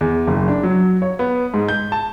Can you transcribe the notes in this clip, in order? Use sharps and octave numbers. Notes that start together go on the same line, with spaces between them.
E2
F#1
D4
F#3
C#5
B3
G#2
G6
A5